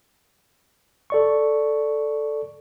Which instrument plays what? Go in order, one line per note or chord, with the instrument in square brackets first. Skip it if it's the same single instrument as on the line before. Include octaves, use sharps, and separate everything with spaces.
[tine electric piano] A4 D5 C#6